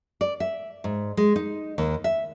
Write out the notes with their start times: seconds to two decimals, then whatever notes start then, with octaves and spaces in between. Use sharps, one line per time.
0.21 D5
0.40 E5
0.84 G#2
1.17 G#3
1.36 D#4
1.78 D#2
2.04 E5